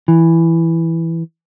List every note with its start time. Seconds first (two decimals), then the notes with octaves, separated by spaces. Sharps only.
0.08 E3